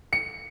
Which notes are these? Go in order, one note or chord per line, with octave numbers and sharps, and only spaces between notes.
C#7